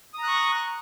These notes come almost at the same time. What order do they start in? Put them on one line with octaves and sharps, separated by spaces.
D#6 A#5 F#6 C#6